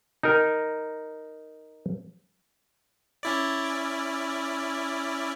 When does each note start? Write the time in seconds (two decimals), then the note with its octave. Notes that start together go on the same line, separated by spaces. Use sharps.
0.23 D#4 A#4
3.23 C#4 E4 D5